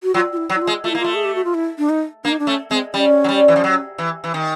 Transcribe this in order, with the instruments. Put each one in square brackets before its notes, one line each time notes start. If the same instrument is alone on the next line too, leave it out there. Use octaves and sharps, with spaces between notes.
[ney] F#4
[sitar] F#3 [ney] F4
[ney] F4
E4
[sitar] F#3
[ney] E4
F4
[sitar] G#3
[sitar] A3 [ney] F4
[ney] E4
[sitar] A#3
[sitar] A3 [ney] F4
[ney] G#4
G4
F#4
F4
E4
D4
D#4
[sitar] A#3 [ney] D4
[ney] D#4
D4
[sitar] A3 [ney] C#4
[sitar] G#3 [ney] C4
[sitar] G3 [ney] C#4
[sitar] F#3
G3
E3
F3
F#3
E3
E3
D#3